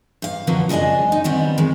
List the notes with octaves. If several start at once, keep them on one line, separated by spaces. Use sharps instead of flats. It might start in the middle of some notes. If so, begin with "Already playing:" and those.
G2 F5
B2 D3 F3 F#3 A#3 B3
C#3 G#3 D4 D#5 G#5
D#4
D#3 G3 B3 C4
D#3 G#3